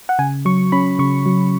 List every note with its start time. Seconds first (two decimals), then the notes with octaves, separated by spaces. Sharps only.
0.09 F#5
0.19 C#3 G#5
0.45 F#3 C#6
0.72 C#4 B5
0.99 C#3 C#6
1.26 F#3